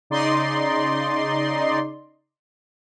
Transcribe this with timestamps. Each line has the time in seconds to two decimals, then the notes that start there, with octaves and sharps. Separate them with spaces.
0.10 C#3 D#4 D5 D#5 C6